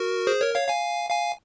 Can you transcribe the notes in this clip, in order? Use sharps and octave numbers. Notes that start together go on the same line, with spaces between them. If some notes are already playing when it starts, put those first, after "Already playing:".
Already playing: F#4 A#4
G#4 C5
A#4 C#5
C#5 F5
F5 G#5
F5 G#5